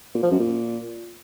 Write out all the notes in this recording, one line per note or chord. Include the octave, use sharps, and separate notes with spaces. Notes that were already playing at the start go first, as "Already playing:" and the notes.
A#2
F3
F#2
A#2